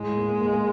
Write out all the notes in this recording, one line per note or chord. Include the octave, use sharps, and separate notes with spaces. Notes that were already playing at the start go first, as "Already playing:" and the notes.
Already playing: A2 G#3
A#3
A#3